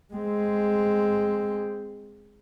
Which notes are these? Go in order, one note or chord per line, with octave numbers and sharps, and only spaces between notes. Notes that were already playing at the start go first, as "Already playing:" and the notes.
G#3 C4